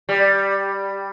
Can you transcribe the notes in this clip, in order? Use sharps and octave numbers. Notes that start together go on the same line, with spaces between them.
G3